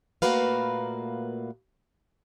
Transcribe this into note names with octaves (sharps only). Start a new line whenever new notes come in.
A#2 A3 A#3 F#4 B4 F5